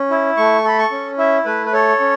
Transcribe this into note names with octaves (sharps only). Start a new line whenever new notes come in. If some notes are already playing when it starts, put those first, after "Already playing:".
Already playing: C#4
E4
A3 C#6
A4 B5
C#6
C#4
E4 E5
A3 B4
B4
A4 C#5
C#4